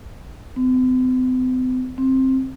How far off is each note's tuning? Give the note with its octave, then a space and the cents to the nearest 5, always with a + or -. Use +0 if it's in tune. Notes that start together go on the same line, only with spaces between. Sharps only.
C4 -45
C4 +10